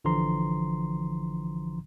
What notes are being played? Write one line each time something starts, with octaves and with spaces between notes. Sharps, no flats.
A1 D3 E3 F3 A#5 C6